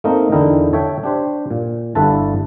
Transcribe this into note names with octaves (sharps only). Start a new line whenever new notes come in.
A3 A#3 C4 D#4 A#4
E2 D3 D#4 E4 A#4 G5
A4 C#5 E5 G5
D4 G4 C5
A#2
G1 G2 E4 A4 B4 A5